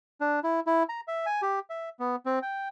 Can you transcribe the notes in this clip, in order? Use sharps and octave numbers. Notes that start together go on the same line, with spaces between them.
D4
E4
E4
A#5
E5
G#5
G4
E5
B3
C4
G5